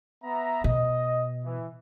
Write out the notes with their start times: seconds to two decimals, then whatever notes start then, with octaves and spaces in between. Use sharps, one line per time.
0.23 B3 E5 A#5
0.64 B2 D#5
1.44 E3